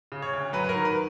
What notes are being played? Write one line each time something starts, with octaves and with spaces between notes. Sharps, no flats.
C#3
C#5
D2
F#3 B4
B4
A#4
D#3
B4